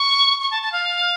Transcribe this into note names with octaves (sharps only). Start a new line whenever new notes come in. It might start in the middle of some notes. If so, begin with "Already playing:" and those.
Already playing: C#6
C#6
A5
A5
F5